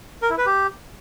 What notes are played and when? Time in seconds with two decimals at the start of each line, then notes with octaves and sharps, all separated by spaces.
0.22 A#4
0.30 E4
0.38 B4
0.46 G4